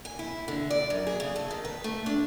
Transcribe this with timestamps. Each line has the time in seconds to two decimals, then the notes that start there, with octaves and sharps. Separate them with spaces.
0.05 G#5
0.19 E4
0.48 D3
0.70 D5
0.90 F#2
1.07 G#4
1.20 C#3
1.36 A4
1.51 D#3
1.65 B4
1.84 A3
2.06 D4